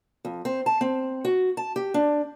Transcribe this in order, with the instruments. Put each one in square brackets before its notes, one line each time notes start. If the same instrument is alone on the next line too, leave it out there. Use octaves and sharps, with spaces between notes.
[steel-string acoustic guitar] F2
C4
A5
C4
F#4
A5
G4
D4